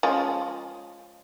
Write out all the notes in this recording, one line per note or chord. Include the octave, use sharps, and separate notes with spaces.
F3 G#3 C#4